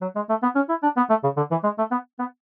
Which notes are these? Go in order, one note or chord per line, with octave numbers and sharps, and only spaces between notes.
F#3
G#3
A3
B3
C#4
E4
D4
B3
A3
C#3
D3
E3
G#3
A3
B3
B3